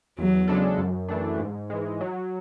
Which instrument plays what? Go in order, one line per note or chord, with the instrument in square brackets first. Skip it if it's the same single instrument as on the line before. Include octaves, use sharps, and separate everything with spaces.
[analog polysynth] E2 [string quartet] F#3
[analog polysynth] C#3 G#3 D4 A4
F#2
E3 A3 D4
G#2
E3 G#3
F#3